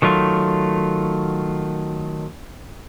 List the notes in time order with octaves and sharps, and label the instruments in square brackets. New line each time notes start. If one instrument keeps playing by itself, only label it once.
[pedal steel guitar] D#3 F#3 A3 F4